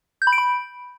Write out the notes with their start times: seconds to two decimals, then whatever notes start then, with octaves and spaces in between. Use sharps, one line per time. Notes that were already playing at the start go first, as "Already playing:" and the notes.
0.22 G6
0.27 B5
0.33 D7
0.38 B5